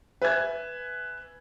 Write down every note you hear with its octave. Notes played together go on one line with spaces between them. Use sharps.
B4 E5 G#5 G#6